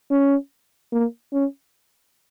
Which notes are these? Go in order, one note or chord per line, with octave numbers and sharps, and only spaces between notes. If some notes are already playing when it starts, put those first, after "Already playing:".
C#4
A#3
C#4